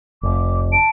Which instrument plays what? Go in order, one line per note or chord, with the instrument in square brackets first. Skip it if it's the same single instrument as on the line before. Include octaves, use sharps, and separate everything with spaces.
[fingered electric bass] F1 [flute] D6
[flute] A5 [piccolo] D7